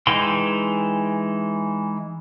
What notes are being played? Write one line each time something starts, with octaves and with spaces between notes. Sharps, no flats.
E3 G#3 D#4 G5 C6